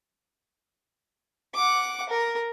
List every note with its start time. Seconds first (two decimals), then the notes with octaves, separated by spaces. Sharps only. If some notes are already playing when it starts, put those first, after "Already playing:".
1.55 F#5 D6
2.09 A#4